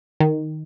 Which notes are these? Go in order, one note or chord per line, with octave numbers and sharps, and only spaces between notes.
D#3